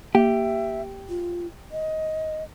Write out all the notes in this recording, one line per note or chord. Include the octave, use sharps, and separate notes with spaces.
A#3 G4 E5
F4
D#5